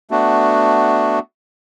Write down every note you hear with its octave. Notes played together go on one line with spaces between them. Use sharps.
A3 B3 D4 F#4